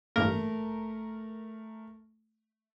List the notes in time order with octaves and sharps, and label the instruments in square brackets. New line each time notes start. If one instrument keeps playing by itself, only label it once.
[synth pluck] A1 G2 A#3 [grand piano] A3 [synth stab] A#4